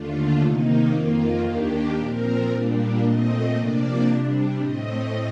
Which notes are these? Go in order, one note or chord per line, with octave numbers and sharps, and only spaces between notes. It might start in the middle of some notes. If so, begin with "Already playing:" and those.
Already playing: D#2 D3 A3 D4 F4
C3 D#3 A#3 D#4
F2 D#3 A#3 F4
D#2 D#3 A#3 D4 G4
A#2 F3 C4 A#4
A#2 G3 A#3 D4
A#2 A3 C4 D#5
C3 F3 A#3 D4 D5
C3 G3 D4
A2 A3 C4 D#5